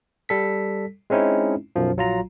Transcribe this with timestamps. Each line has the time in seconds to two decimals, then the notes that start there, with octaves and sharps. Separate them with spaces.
0.29 G3 A4 B6
1.10 G#3 C4 C#4 D#4 E4
1.76 B1 F#2 F3
1.96 A#1 F#3 F4 A#5